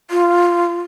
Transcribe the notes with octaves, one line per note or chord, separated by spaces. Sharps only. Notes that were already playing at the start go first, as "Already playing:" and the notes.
F4